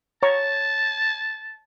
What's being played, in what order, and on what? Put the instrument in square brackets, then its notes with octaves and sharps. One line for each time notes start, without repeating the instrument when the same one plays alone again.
[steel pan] C#5 A#5 C#6 [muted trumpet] A5